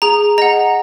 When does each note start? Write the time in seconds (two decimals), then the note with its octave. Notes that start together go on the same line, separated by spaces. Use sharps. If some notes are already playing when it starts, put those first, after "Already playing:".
0.02 G#4 A#5
0.38 D#5 F#5 A#5